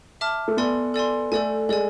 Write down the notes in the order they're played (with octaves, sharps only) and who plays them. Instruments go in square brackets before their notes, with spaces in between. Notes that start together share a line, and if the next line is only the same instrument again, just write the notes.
[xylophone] E5 A5 D6 F6
[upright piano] A3
[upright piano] B3 [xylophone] A4 D5 G#5 C6
[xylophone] A4 D5 G#5 C6
[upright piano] A3 [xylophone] A4 D5 G#5
[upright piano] G#3 [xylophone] A4 D5 G#5